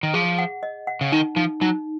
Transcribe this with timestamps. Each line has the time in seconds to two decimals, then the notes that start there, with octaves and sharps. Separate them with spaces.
0.03 D#3
0.14 F3 G#4
0.38 F#5
0.63 D#5
0.87 F#5
1.01 C#3
1.12 D#3 D#4
1.36 F3 D#4
1.61 F#3 D#4